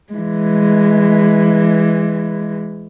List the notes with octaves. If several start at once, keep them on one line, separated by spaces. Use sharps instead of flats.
E3 G#3